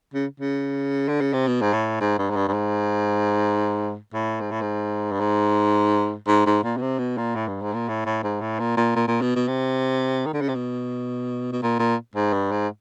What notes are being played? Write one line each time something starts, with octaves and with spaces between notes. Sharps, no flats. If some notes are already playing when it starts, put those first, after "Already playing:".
C#3
C#3
D3
C#3
C3
B2
G#2
A2
G#2
G2
G#2
G2
G2
G#2
A2
G#2
A2
G#2
G2
G#2
G#2
G#2
A#2
B2
C3
B2
A#2
A2
G2
G#2
A#2
A2
A2
G#2
A2
A#2
A#2
A#2
A#2
B2
B2
C3
D#3
D3
C#3
C3
B2
B2
A#2
A#2
G#2
G2
G#2